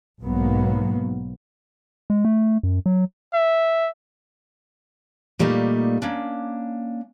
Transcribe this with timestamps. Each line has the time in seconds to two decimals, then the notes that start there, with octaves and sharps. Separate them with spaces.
0.21 B1 G#2 B2 F#3 A#3 B3
2.10 G#3
2.25 A3
2.63 F#2
2.86 F#3
3.33 E5
5.39 A#2 G3 A3 A#3 D#4
6.02 A#3 C#4 D4